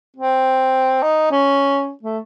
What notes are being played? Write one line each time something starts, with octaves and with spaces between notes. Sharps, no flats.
C4
D#4
C#4
A3